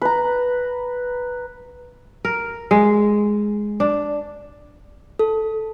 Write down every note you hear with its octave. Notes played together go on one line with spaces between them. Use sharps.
B4 A#5
A#4
G#3
D4
A4